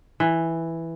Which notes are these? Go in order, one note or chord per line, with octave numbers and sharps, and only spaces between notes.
E3